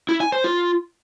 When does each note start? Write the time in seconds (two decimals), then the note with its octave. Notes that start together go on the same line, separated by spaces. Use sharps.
0.09 E4
0.21 G#5
0.32 C5
0.44 F4